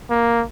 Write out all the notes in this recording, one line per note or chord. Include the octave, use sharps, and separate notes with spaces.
A#3